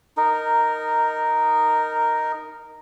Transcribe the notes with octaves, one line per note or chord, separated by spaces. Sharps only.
D#4 A#4